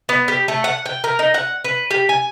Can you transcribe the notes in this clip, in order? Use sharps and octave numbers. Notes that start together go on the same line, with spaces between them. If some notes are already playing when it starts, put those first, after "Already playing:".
B3
G4
A3
F#5
G5
A#4
D#4
F#5
B4
G4
G#5